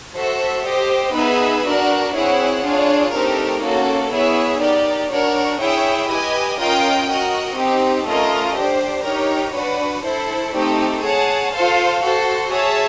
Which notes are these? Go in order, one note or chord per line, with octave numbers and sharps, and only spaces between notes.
F#4 A4 C5 E5
G4 C5 D#5
B3 D#4 G#4 B4 E5
D4 F#4 A#4
C4 E4 G#4 C#5 F#5
D4 F4 G#4 C#5
A3 C4 D#4 G4 A#4
A#3 C#4 F#4 A4
B3 E4 G#4 C#5 E5
D#4 G4 A#4 D5
D4 F#4 A#4 C#5
E4 G#4 C#5 E5 G5
G4 B4 D#5 G#5
C#4 F4 A#4 D#5 G5
F#4 A#4 D#5
C4 D#4 G4
A3 C#4 F4 A#4 D#5
D4 G4 C5
D#4 G4 A#4 C#5
D4 F#4 B4
E4 A4 C5
A3 C4 D#4 G4
G#4 C#5 F#5 A5
F4 A4 C5 F5
F#4 A4 C5
G#4 C#5 E5 A5